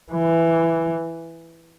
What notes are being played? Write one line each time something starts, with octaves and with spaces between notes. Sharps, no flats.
E3